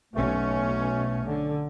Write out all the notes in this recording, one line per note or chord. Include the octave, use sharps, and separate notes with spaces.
B1 B2 A3 C#4
D3